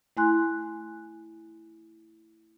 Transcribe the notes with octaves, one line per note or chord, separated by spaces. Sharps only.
A3 E4 G#5 C6 F#6